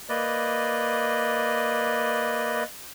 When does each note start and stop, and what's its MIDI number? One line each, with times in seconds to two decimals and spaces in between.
0.09 2.63 58
0.09 2.63 71
0.09 2.63 74
0.09 2.63 75